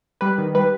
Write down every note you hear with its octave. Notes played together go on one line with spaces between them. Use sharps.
G3 B4
D#3
G3 B4